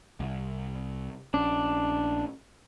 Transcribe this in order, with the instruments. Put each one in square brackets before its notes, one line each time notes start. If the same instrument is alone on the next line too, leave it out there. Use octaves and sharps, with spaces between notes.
[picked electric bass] C2
[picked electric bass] A#1 C#4 [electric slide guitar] D4